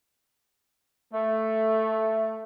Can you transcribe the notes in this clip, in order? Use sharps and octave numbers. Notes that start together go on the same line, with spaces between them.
A3